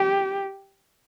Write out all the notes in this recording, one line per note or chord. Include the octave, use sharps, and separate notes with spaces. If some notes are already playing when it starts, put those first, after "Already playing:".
Already playing: G4